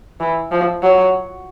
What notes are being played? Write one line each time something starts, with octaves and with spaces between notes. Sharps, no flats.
E3
F3
F#3